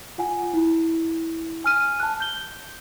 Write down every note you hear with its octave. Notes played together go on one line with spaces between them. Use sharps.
F4 F#5 G#5
E4
G#5 F6 D#7
A5 F#6
G6 G7